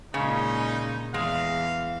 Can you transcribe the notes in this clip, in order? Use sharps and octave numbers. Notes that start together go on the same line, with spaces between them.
A#2 C#3 G#3 C#4 D#4
E2 G#3 F5